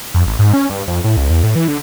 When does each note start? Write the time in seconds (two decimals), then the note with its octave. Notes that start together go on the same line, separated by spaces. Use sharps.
0.14 F2
0.26 A1
0.39 G#2
0.54 C#4
0.70 G2
0.88 F2
1.04 A2
1.17 C#2
1.30 E2
1.43 A2
1.56 E3
1.68 D3